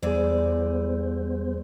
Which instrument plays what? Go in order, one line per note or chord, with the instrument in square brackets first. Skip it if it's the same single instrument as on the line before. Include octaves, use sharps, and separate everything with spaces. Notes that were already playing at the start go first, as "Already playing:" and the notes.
[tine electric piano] E2 G#4 [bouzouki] D3 E3 D5 [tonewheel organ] G3 B3 C5